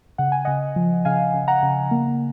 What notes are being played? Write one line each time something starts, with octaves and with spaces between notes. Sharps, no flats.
C#3 F#5
G#5
C#3 D#5 F#5
F3
C#3 F5 G#5
C#3
F#5 A#5
C#3
A#3